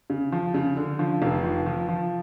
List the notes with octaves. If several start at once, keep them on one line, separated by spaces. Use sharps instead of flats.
C#3
F3
C#3
D3
F3
F1
F3
F3
F3